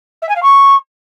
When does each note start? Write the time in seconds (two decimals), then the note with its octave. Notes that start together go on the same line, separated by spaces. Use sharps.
0.22 E5
0.29 G#5
0.36 F5
0.43 C#6